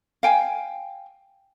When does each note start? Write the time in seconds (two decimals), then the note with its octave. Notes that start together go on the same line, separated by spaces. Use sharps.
0.23 F5 G5 G#5